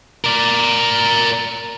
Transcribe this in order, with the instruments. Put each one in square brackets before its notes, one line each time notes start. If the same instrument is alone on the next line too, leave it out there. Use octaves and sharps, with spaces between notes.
[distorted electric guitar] A#4 D5